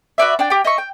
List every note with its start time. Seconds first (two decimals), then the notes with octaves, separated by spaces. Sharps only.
0.18 F#4 B4 D5 E5
0.39 D4 G5
0.50 G4 G5
0.65 D#5 E5 C#6
0.78 G5